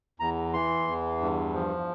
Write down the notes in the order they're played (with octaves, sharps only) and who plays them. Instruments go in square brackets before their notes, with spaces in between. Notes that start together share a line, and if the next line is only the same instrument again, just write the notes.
[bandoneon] E2 A#5
E3 C6
E2
G2
F3